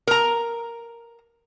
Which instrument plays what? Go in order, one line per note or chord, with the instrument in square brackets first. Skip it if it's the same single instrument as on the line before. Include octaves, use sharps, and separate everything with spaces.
[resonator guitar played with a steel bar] A#4 A#5